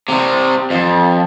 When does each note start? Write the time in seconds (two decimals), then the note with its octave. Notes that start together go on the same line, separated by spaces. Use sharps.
0.08 C3 G3
0.70 F2